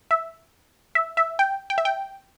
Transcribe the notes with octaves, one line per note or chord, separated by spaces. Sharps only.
E5
E5
E5
G5
G5
E5
G5